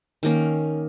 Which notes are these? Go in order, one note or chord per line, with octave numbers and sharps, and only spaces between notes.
D#3 A#3 C#4